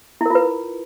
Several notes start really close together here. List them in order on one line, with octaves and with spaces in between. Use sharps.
E4 A#4 F4 B4